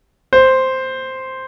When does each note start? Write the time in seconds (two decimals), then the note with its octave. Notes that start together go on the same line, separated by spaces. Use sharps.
0.33 C5